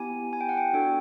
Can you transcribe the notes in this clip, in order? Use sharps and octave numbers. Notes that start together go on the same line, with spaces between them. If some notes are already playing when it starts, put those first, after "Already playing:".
Already playing: B3 E4 G4 G#5
G#5
G5
F#5
G5
D4 F#4 A4 G5